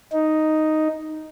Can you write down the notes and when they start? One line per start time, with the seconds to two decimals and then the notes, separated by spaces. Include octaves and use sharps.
0.13 D#4